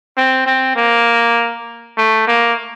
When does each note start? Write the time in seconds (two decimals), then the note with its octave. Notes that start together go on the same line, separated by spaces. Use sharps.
0.17 C4
0.46 C4
0.76 A#3
1.98 A3
2.27 A#3